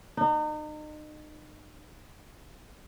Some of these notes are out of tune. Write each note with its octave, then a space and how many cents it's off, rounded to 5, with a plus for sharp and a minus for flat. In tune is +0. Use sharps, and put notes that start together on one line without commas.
D#4 -35